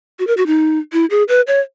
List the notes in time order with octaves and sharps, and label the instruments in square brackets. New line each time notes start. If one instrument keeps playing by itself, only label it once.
[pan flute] F#4
A#4
F#4
D#4
E4
G#4
B4
C#5